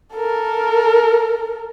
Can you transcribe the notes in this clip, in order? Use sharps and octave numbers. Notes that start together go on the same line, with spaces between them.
A4 A#4